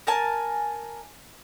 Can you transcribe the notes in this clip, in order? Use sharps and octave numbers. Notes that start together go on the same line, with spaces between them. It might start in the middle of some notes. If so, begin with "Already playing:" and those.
A#4 G#5 A5